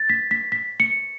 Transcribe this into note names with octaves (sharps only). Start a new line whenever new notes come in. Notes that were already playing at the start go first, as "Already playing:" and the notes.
Already playing: A6
B6
B6
B6
C#7